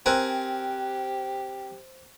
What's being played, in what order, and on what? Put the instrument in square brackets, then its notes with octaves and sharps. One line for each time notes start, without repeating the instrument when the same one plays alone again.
[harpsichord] C4 A#4 G#5 [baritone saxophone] G4 [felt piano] C5 F#6